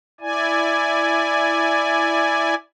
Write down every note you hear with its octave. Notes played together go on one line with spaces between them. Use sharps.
E4 D5 G#5